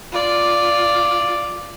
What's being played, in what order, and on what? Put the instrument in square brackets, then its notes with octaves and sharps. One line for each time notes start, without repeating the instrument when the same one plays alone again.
[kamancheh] F4 D5